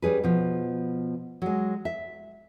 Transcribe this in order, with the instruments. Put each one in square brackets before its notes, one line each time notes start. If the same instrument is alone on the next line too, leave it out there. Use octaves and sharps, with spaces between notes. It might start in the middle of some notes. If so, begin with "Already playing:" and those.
[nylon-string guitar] G3 C#4 G#4 B4
B2 F3
F#3 G#3
E5